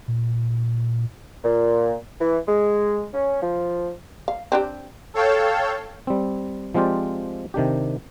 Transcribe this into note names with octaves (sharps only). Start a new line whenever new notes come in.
A#2
A#2
E3
G#3
C#4
F3
F5
C4 D4 G4
A4 C#5 F5 G5 A5
G3 C4
F3 G#3 C4 F4 G4 D5
C3 D#3 D4 G4